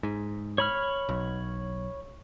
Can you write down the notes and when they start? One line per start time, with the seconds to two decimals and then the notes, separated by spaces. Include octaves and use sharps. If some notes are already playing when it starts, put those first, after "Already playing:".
0.03 G#2
0.58 C#5 B5 F6
1.09 B1